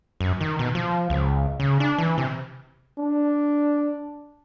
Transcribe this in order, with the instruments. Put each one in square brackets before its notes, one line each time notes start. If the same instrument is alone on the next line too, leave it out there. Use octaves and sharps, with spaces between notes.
[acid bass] F#2
D#3
B2
F3
C#2
C#3
D4
E3
C3
[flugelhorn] D4